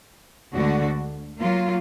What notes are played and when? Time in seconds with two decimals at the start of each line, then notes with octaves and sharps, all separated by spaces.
0.53 D2 D3 G#3 D4 F#4
1.39 F#3 A#3 F4